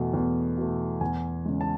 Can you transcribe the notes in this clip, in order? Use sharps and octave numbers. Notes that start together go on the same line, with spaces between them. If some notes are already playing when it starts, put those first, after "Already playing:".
Already playing: E2 B2 A3
E2
B2 A3
E2 G#5
C#3 G#3
A5